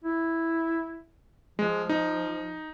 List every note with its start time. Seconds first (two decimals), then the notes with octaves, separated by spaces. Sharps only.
0.04 E4
1.59 F3 G#3
1.89 D#4